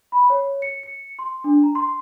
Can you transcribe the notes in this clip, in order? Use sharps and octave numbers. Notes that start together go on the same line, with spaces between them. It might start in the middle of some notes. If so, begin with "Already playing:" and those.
B5
C#5
C#7
C#7
C6
D4
A#5
C6